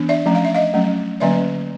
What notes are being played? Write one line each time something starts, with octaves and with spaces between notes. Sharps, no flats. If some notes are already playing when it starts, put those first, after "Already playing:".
Already playing: E3 B3 D4
D5 E5
F3 A3 C#4
F5
E5
D#5 F5
F#3 A3 C#4
D3 F#3 A#3 C#4 D5 E5